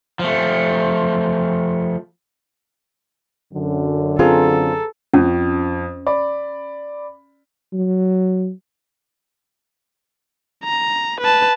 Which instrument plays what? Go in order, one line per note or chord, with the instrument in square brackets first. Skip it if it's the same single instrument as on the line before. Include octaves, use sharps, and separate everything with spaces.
[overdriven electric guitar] F3 A3
[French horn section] F#2 D3
[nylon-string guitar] C4 F4 [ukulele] G#4 B4 A#5 [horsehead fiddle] A4
[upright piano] F2 [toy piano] C#4
[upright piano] D5 B5
[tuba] F#3
[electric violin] A#5
B4 A5